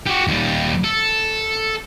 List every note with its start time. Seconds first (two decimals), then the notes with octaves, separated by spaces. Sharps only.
0.06 F#4 G4
0.28 D#2 G3
0.84 A4